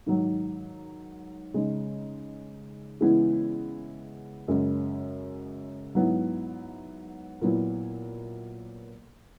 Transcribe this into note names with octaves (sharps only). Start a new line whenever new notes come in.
G#2 D#3 F#3
C#3 G#3 D#4
C#3 E3 G#3 B3 E4
F#2 C#3 G#3 C#4
G#2 F#3 B3 E4
A#2 F#3 B3 E4